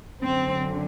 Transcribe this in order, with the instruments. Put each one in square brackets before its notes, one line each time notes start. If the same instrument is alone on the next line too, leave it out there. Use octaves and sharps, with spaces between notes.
[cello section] F#2 D3 C4